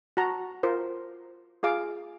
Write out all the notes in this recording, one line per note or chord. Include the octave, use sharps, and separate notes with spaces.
F#4 A5 A#5
F4 A#4 C5
F4 G#4 F5 D6